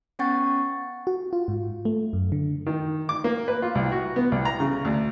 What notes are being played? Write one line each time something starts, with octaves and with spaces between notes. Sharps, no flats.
B3 C#4 F#5 G5 C#6 A6
F#4
F4
G#2
A3
F#2
D3
D#3
D6
A#3
B4
F4
C2
F#4
B3
C2
A#5
C#3
D2